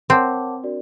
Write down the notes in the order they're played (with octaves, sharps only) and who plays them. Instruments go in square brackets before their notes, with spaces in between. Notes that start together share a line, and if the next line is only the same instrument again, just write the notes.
[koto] C4 [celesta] A#4 C#5 F#5 A5 D6
[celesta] D4 F#4 A#4 D5